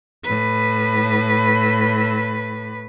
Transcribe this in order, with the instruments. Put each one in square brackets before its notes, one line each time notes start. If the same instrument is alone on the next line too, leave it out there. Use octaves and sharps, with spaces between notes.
[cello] A2 B4